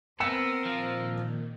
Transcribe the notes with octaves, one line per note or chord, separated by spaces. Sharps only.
B3 C4 A#4 E6 C#7 E7
A#2 D#3 F3